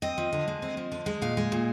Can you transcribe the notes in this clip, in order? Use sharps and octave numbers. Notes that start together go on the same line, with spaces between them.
C4 D#5
F3
D3
G#3
C4
F3
D3
G#3
A#2 F5
G#3
A#2